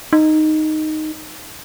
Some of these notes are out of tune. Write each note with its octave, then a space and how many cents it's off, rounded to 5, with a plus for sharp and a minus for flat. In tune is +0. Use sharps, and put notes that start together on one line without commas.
D#4 -5